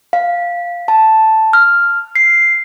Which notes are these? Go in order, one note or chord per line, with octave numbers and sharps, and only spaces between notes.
F5
A5
F6
C7